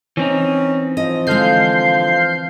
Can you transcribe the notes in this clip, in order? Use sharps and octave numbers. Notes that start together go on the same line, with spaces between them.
E3 C4 C#4 D#4
F3 D#5
D3 G#3 F5 G6 C7